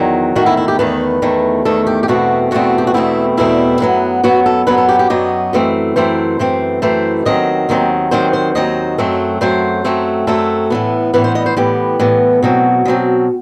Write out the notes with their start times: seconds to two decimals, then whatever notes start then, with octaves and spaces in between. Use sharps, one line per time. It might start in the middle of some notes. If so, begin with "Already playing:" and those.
Already playing: E2 D#3 F#3
0.35 E2 D#3 A3 F#4
0.46 E4
0.57 E4
0.68 G4
0.79 E2 D#3 A3 B4
1.22 E2 D#3 A3
1.65 E2 D#3 A3 A4
1.87 G4
2.03 G4
2.08 E2 B2 A3 C4 F#4
2.51 E2 B2 A3 C4 F#4
2.78 G4
2.87 F#4
2.94 E2 B2 A3 C4 E4
3.37 E2 B2 A3 C4 E4
3.80 F#2 F#3 B3
4.23 F#2 F#3 B3 F#4
4.46 A4
4.67 F#2 F#3 B3 B4
4.78 A4
4.89 G4
4.99 G4
5.10 F#2 F#3 B3 D#5
5.53 F#2 E3 A3 C4
5.96 F#2 E3 A3 C4 C5
6.39 F#2 E3 A3 C4
6.82 F#2 E3 A3 C4 C5
7.25 D#2 D#3 F#3 C4 D#5
7.69 D#2 D#3 F#3 C4
8.11 D#2 D#3 F#3 C4 C5
8.33 C5
8.55 D#2 D#3 F#3 C4 D#5
8.98 F#2 F#3 A3 C4
9.41 F#2 F#3 A3 C4 C5
9.84 F#2 F#3 A3 C4
10.27 F#2 F#3 A3 C4 A4
10.70 A2 E3 B3
11.13 A2 E3 B3 B4
11.24 C5
11.35 D#5
11.46 C5
11.57 A2 E3 B3 G4
11.99 A2 E3 B3
12.42 B2 F#3 C4 F#4
12.85 B2 F#3 C4